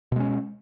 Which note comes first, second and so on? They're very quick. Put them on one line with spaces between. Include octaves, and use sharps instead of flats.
B2 G#3 C#4